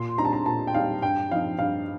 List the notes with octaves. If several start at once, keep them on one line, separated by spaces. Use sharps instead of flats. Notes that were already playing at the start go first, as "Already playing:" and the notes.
Already playing: A#2 C6
G3 C4 D#4 A#5
A5
A#5
A#2 A5
G5
G3 C4 D#4 F5
G2 G5
F3 C4 D#4 F5
G2 F5